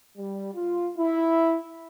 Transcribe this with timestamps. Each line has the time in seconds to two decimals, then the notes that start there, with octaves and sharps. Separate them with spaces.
0.17 G3
0.54 F4
0.98 E4